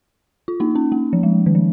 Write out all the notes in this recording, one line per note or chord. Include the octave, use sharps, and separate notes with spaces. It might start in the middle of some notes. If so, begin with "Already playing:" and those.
F4
A#3 D#4
C#4
A#3
F3
G#3
D#3
F3